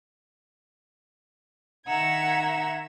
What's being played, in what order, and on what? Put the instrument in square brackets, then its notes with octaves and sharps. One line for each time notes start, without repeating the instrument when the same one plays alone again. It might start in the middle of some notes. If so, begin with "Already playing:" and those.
[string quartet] D#3 E5 F#5 A#5 E6 G#6